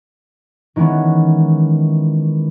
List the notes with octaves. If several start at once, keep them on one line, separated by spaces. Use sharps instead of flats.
D#3 E3 G#3 B3 C#4